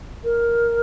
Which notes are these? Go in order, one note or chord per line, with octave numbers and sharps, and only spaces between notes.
A#4